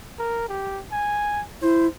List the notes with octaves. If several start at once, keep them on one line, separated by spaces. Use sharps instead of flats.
A#4
G4
G#5
E4 C5